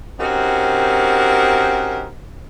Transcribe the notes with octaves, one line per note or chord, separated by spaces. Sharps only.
C4 C#4 D#4 F#4 G4 A#4